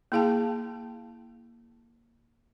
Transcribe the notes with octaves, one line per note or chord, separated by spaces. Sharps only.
A#3 E4 G#4 F5 G5 A5